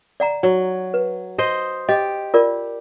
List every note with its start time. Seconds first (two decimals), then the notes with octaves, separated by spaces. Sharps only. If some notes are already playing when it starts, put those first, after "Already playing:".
0.20 D5 F#5 A#5
0.43 F#3
0.94 B4
1.38 C5 D#5
1.89 G4 D#5
2.34 F4 A#4 D5